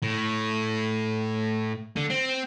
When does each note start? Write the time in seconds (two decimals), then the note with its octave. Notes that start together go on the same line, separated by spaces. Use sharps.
0.03 A2
1.97 D3
2.10 C4